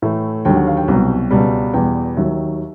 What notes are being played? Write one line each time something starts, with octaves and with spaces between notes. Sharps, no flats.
A2 E3 A3 E5
D#2 D3 F#3 G5
F#5
F5
G5
C2 B2 F#3
C#2 B2 G3
E2 B2 G3 G5
D#2 D#3 F#3 E5